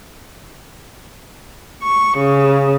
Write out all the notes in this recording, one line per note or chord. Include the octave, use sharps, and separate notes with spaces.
C#6
C#3